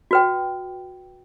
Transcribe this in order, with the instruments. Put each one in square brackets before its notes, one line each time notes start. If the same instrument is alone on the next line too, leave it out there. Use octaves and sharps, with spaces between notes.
[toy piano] F#4 B4 G5